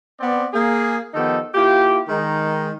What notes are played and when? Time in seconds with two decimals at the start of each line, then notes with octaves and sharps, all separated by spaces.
0.20 B3 C4 D5
0.54 A#3 G#4
1.14 D#3 F3 B3 D#4 G4 A4
1.55 A#3 E4 F4 G4
2.08 D#3 G#3 D#4